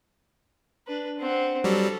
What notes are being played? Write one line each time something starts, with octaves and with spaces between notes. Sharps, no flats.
D4 B4
C4 F#5
F#3 G3 A4